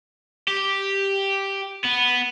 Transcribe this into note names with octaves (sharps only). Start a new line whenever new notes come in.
G4
B3